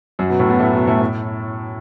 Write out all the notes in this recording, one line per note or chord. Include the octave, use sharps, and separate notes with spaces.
F#2 F#3
B2 B3
A2 A3
B2 B3
A2 A3
B2 B3
A2 A3
A2